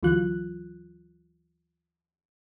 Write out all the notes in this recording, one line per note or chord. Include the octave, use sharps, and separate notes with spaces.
D2 E3 F#3 F4 F#6